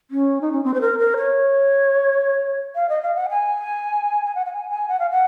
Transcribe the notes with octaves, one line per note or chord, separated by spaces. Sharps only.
C#4
D#4
C#4
C4
C5
A#4
A#4
C#5
F5
D#5
F5
F#5
G#5
G#5
F#5
F#5
G#5
G#5
F#5
F5
F#5